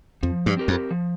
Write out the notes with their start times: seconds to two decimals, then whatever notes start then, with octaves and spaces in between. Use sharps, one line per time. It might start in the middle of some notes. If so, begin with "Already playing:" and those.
0.23 F2 F3
0.46 G2
0.57 C4 G4 A#4
0.68 F2
0.91 F3